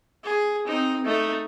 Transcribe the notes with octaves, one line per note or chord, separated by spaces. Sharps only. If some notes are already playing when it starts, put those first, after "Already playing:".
G#4
C4 D#4
A3 D#4